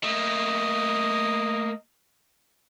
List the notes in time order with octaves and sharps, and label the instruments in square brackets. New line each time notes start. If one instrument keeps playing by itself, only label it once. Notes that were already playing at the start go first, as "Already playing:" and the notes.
[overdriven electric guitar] A3 A#3 [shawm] D#5